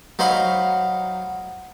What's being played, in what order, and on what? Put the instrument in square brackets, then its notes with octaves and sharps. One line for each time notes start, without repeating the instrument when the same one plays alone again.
[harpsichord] F#3 D#4 C5 F5 B5